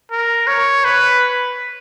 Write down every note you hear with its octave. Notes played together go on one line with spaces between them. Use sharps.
A#4
C#5
B4